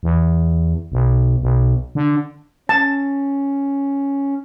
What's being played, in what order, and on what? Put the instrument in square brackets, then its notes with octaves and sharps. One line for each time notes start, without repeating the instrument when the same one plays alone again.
[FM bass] E2
B1
B1
D3
[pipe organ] C#4 [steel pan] A5